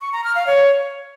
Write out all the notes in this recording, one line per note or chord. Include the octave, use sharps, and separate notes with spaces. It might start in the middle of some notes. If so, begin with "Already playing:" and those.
C#6
A#5
F6
F5
C#5